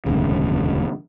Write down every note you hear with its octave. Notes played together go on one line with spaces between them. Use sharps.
E1 D2 G2 C#3